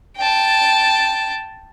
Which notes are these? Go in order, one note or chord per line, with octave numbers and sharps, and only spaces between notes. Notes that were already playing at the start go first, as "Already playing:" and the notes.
G5 A5